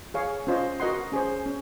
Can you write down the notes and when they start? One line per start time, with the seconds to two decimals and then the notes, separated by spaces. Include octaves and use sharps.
0.14 G#4 C#5 F5
0.47 C#4 F4 C5 D#5
0.80 F#4 A#4 D#5 F#5 C6
1.12 C#4 G#4 C5
1.46 C#4